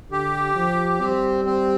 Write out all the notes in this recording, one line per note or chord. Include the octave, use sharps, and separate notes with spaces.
D3 G4
F3
G3 C4
C4